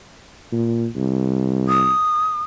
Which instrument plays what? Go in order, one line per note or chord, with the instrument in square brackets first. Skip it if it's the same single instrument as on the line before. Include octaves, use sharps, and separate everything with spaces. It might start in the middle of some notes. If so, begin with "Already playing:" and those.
[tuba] A#2
C2
[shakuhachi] D#6